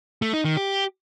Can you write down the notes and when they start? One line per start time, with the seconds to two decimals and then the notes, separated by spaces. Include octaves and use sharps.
0.22 A3
0.34 D#4
0.45 D#3
0.57 G4